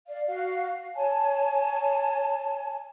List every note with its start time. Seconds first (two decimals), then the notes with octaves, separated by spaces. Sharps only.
0.08 D5 F5
0.27 F#4 F5
0.96 C#5 G#5 A5